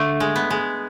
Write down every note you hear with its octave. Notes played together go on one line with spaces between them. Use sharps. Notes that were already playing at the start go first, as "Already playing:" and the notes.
Already playing: D3 A3
G#3
B3
G#3